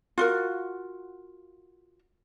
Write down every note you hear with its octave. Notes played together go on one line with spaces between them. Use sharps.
F4 F#4 A#4